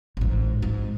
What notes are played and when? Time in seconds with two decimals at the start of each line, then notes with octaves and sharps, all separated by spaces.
0.17 A1 G#2
0.62 G#2